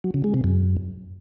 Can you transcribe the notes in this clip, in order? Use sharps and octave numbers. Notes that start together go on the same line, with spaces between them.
F#3
C#3
G#3
C3
F#2